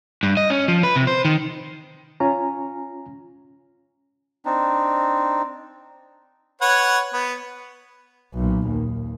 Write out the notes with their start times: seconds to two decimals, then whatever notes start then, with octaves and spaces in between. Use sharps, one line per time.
0.23 G2
0.37 D#5
0.50 C#4
0.68 F3
0.83 B4
0.96 C3
1.07 C5
1.25 D#3
2.20 C#4 F4 G#5 A#5
4.45 C4 D4 D#4
6.62 B4 C#5 F#5
7.13 B3
8.34 B1 A#2
8.68 D#2